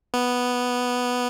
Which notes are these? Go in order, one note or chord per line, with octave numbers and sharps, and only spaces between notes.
B3